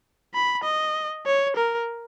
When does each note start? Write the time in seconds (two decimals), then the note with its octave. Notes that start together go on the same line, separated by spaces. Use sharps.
0.34 B5
0.64 D#5
1.26 C#5
1.56 A#4